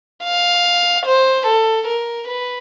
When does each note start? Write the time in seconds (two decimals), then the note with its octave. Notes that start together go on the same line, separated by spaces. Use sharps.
0.24 F5
1.06 C5
1.47 A4
1.88 A#4
2.28 B4